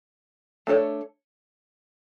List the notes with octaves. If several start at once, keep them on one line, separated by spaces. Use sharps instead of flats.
A3 D4 A4 C#5